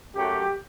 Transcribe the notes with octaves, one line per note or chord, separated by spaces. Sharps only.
F#2 F#3 A3 G4